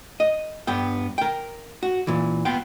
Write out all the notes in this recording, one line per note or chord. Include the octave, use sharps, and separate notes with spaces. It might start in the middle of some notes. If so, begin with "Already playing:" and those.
D#5
G2 B3 G5
A#4 G5
F#4
A#2 E3
B3 F4 G5